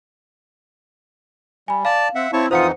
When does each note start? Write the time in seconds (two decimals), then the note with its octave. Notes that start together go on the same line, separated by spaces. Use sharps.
1.68 G3 G#5 B5
1.85 D5 F5 A5
2.15 C4 E5 F#5
2.33 C4 E4 C#5 A5 C#6
2.51 F2 E3 D#4 F4 C5 F#5 D#6 C#7